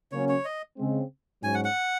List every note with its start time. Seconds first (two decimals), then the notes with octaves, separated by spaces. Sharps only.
0.12 C#3 F#3 A#3 C#4 C#5
0.29 C#5
0.45 D#5
0.78 C#3 G#3 C4
1.43 G#2 F#3 C#4 G#5
1.54 F#5
1.65 F#5